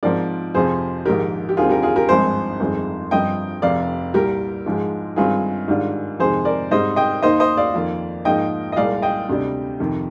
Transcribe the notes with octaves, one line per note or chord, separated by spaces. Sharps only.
G#2 F3 C4 A#4 D5
F2 C3 F3 C4 G#4 C5
A#1 G#2 D#3 G4 A#4
G4
D#2 D3 G3 C4 F4 G#4
G4 A#4
F4 G#4
G4 A#4
G#1 G2 F3 G#3 C4 G#4 C5
G1 F2 D#3 G#3 C4
G1 G2 F3 C4 D#5 G5
F1 F2 C3 D5 F5
C2 A#2 G3 G4 A#4
G#2 F3 G#3
G1 G2 D#3 G#3 C4 F4 G#4
G#2 D#3 G3 D4 F4
F2 C3 D#3 G#3 G#4 C5
A#4 D5
G#2 G3 C4 C5 D#5
D#5 G5
D#2 D#3 A#3 D#4 C5 D#5
C5 D#5
D5 F5
F2 D#3 A#3 F4
G#2 F3 A#3 D#4 D#5 G5
D#5
C2 A#2 G#3 D5 F5
D#5 G5
D2 C3 G3 D4
F2 C3 D#3